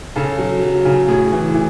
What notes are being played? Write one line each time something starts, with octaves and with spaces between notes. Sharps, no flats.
C#3 A4
F#3
F#3
C#3
A2 G#4
E3
E3